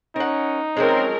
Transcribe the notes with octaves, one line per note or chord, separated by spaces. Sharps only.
C#4 D#4 A#4 F#5
F3 F#3 G#3 C4 C#4 A#4